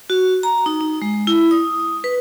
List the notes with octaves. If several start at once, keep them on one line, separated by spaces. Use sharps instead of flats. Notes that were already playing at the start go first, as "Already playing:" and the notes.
F#4
A#5
D#4
D#4
G#3
E4
D#6
B4